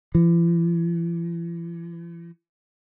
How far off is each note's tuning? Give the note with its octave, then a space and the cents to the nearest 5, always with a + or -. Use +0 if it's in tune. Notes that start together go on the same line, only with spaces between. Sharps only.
E3 +45